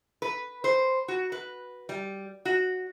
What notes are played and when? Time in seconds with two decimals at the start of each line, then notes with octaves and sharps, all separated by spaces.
0.22 B4
0.64 C5
1.08 F#4
1.32 B4
1.89 G3
2.45 F#4